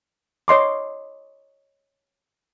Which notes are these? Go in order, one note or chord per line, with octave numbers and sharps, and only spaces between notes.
C#5 D#5 C6 D6